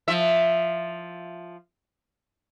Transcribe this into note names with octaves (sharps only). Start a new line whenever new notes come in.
F3 E5